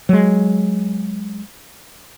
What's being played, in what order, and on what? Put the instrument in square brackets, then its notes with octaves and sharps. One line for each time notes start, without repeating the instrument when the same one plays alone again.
[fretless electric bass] F#3 G#3